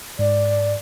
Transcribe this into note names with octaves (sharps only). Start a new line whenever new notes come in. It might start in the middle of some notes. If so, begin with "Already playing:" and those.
G#2 D5